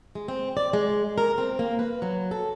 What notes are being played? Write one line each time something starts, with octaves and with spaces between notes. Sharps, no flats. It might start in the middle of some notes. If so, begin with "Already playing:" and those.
G#3
C4
D5
G#3
A#4
C4
A#3
B4
F#3
A4